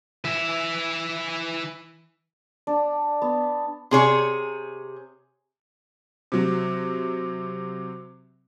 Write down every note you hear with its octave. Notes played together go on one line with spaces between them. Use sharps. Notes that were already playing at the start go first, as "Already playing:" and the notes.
E3 E5
D4
B3
C3 G#4 C#5
C3 F#3